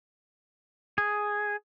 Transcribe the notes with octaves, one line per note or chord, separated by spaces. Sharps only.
G#4